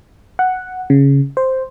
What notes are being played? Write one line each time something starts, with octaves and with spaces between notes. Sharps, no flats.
F#5
C#3
C5